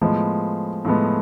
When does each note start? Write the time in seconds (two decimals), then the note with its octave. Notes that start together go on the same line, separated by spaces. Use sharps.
0.02 A2 F3 G#3 B3
0.85 A2 F3 G#3 B3